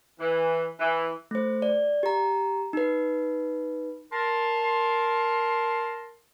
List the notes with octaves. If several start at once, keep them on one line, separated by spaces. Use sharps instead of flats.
E3
E3
A3 C5
D5
G4 A#5
D#4 B4
A#4 A5 C6